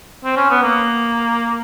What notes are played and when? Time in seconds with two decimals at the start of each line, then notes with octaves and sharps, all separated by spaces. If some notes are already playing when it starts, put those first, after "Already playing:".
0.25 C4
0.37 C#4
0.50 B3
0.63 A#3